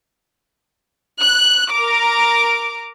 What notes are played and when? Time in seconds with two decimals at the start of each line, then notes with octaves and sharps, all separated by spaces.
1.20 F#6
1.70 A#4 A#5 D6